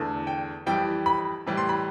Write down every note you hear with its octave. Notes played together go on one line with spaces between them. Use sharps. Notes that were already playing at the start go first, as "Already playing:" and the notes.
Already playing: E2 D3 A3
G5
F2 E3 G3 G5
B5
A2 E3 G3
C6
B5